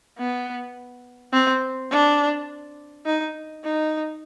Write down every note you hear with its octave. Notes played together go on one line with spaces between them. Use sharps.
B3
C4
D4
D#4
D#4